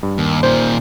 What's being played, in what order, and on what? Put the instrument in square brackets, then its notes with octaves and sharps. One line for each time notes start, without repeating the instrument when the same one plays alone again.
[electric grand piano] G2
[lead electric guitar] D#2
[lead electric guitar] A#2 D#3 [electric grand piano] C5